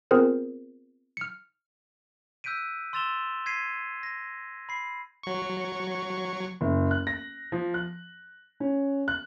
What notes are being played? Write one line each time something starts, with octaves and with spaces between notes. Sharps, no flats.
B3 C4 F4 G#4 A#4 C5
F6 C#7
E6 F#6 G6 B6 D7 D#7
C6 E6 A6 E7 F7 G7
G#6 B6 C7 D#7
A#6
B5 C7
F#3 C#6
F#1
F#6
A#6
F3
F#6
C#4
F#6